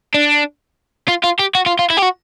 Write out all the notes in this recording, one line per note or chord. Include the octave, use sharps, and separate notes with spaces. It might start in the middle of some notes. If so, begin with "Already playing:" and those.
D4
F4
F4
G4
F#4
F4
F4
E4
G4
F#4